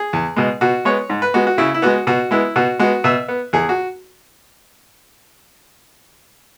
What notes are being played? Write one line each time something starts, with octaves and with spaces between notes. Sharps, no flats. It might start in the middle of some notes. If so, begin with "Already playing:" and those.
Already playing: G#4
E2
B2 G#3
B2 F#4
G#3 B3 C#5
G#2
B4
G#3 B3 F#4
F#4
C#3 E4
E4
G#3 B3 F#4
B2 F#4
G#3 B3 E4
B2 F#4
G#3 B3 F#4
B2 E5
B3
E2 G#4
F#4